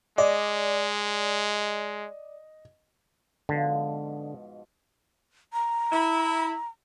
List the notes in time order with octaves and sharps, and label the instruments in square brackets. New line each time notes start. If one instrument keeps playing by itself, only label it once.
[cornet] G#3 [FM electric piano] D5 [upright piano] D#5
[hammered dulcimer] G#2 B2 F3 [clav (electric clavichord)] D3
[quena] A#5
[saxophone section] E4